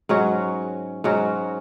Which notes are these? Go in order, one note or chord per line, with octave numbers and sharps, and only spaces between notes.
G#2 F#3 C#4 F#4
G#2 F#3 C#4 F#4